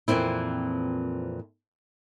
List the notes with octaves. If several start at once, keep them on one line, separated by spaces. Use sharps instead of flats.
F2 A#2 E3 C4 E4